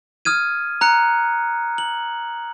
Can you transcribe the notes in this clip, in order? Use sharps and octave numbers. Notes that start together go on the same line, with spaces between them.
D#6 F6 G#6 D#7
A#5 F#6 C#7
F#7